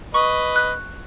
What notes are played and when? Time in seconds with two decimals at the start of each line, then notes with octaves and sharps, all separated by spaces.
0.14 B4 D#5 C#6
0.56 F#6